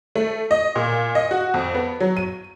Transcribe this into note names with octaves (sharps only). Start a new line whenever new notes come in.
A3
D#5
A#2
D#5
F#4
F2
B3
F#3
D#7